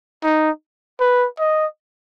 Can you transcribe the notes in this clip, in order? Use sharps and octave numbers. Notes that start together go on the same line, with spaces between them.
D#4
B4
D#5